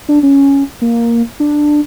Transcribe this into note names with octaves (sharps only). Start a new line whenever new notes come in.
D4
C#4
A#3
D4